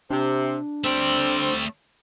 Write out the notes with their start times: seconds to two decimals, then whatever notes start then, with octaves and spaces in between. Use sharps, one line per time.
0.10 C3 D4
0.84 G3 A3 C4 D5